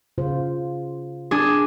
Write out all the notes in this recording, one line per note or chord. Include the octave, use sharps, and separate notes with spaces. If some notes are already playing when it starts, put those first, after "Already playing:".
C#3 F4 C5
D4 G#4